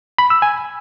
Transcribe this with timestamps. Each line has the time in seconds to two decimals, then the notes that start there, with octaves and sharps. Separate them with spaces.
0.19 B5
0.30 E6
0.42 G#5